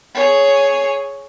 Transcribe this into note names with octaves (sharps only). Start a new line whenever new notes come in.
G#4 C#5